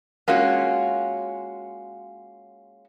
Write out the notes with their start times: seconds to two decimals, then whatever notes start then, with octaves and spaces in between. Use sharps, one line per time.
0.28 G#3 A#3 C#4 F4 F#4